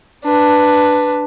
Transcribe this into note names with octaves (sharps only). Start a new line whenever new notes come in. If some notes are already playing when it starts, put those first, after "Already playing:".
D4 B4